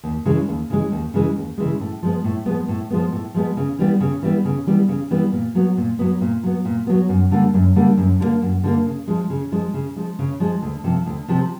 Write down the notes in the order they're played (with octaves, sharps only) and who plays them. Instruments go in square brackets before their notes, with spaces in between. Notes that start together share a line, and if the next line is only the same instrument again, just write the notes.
[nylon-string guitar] D#2
C#3 E3 G#3
D#2
C#3 E3 G#3
D#2
C#3 E3 G#3
D#2
C#3 E3 G#3
A2
F3 G#3 B3
A2
F3 G#3 B3
A2
F3 G#3 B3
A2
F3 G#3 B3
C#3
E3 G3 B3
C#3
E3 G3 B3
C#3
E3 G3 B3
C#3
E3 G3 B3
A#2
F#3 B3
A#2
F#3 B3
A#2
F#3 B3
A#2
F#3 B3
F#2
D3 G3 A#3
F#2
D3 G3 A#3
F#2
D3 G3 A#3
F#2
D3 G3 A#3
C#3
F3 G#3
C#3
F3 G#3
C#3
F3 G#3
C#3
F3 G#3
D2
C3 F3
D2
C3 F3